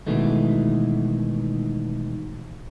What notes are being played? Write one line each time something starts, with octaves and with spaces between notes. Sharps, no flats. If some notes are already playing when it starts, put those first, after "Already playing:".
B2 D#3 E3 G#3 A3